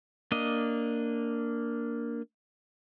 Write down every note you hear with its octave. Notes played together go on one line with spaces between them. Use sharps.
A#3 D4 D#5